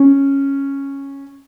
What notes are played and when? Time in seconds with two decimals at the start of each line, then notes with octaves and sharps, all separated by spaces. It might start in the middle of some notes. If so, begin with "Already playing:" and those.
Already playing: C#4